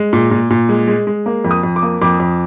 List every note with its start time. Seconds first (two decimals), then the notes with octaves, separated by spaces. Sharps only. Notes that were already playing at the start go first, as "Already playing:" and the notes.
Already playing: G#3
0.13 A#2
0.31 A#2
0.50 A#2
0.69 G#3
0.87 G#3
1.07 G#3
1.26 A#3
1.44 F2
1.51 D#6
1.63 F2
1.76 D6
1.83 A#3
2.01 F2 D6
2.20 F2